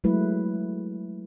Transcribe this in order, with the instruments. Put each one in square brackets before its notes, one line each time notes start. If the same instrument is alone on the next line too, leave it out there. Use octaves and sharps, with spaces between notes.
[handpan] F#3 G#3 A3 E4 B4